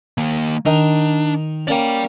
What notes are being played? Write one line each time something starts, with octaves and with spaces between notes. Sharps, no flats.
D#3 A#3
D#3 D4 D#4
A#3 C#4 D5 G5